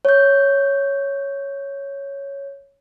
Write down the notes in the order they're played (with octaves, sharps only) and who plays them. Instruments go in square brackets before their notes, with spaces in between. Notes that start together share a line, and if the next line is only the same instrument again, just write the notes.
[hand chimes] C#5 G6